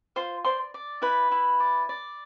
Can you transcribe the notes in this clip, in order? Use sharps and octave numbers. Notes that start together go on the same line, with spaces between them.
F4 C5 C6
C5 D5 C6
D5
E4 B4 B5
E4
D5
D5